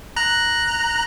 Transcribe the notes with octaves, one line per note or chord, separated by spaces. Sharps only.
A#5 F#6